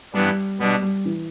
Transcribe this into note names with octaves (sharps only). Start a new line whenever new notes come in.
G2 E3 G3 B3 D4
B2 G3 B3 D4
G3
E3